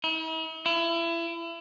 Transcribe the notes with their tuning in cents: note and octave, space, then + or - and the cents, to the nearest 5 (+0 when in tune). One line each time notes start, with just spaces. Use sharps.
E4 -45
E4 +30